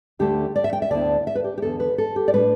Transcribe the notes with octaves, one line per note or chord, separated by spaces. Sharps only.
D2 D3 A3 D4 G4
D5
E5
G5
E5
D2 D3 B3 E4 D5
E5
B4
G4
G4
E2 D3 B3 A4
B4
A4
G4
D5
A2 A3 D4 B4